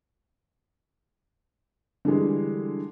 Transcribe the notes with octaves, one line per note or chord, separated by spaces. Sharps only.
D3 E3 G3 G#3